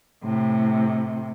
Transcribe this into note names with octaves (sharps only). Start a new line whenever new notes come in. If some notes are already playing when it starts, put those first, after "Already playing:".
A2 C3